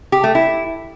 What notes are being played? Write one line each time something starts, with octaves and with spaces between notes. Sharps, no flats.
G4
A3
E4